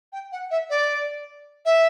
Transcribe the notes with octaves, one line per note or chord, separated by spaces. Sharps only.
G5
F#5
E5
D5
E5